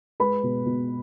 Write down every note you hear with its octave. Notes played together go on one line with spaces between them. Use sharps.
G#3 B4 B5
B2
B2